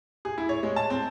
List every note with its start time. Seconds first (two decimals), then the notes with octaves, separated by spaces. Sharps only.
0.25 G#4
0.38 E4
0.49 C#5
0.63 G#3
0.76 A5
0.90 C4